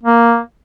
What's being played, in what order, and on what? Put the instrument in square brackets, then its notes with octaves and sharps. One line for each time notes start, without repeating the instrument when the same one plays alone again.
[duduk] A#3